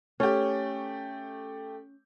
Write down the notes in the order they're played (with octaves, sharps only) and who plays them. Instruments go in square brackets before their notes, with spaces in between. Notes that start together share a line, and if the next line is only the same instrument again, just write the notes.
[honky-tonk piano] A3 G4 [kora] C#4